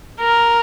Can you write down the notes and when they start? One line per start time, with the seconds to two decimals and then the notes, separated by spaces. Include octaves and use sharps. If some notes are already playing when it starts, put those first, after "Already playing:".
0.20 A#4